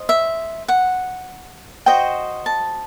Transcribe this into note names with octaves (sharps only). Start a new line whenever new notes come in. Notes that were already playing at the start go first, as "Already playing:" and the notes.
Already playing: C5 D#5
E5
F#5
F#4 C5 D#5 G5
A5